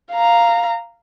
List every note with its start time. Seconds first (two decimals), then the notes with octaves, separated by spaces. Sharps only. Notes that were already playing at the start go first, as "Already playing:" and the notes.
0.12 F5 A#5